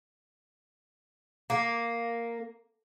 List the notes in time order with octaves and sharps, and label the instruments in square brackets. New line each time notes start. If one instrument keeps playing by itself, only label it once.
[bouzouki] A#3